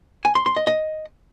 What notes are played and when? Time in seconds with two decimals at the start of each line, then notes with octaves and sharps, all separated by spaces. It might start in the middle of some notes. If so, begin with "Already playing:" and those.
0.25 G#5
0.35 C6
0.46 C6
0.56 D#5
0.67 D#5